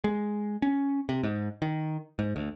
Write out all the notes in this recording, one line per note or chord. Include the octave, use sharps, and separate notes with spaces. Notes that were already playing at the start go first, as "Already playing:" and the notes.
G#3
C#4
C3
G#2
D#3
G#2
D2